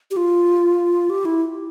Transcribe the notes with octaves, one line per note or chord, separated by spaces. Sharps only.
G4
F4
G4
E4